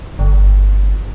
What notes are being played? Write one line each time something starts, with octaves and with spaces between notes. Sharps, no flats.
G1